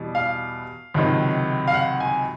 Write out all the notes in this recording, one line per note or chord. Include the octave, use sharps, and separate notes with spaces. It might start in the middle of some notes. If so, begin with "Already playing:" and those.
Already playing: E2 B2 G3
F5
C#2 C3 D#3 F#3
F5
F#5
G#5